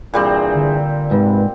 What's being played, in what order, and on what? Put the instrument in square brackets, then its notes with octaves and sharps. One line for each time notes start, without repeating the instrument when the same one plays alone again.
[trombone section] G2 E3 G#4 [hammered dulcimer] A#2 G3 C4
[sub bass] D3
[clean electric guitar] G#2 [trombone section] C3 B4